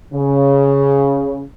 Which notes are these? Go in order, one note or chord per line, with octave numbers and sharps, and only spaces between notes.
C#3